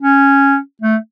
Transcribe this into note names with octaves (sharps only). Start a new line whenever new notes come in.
C#4
A3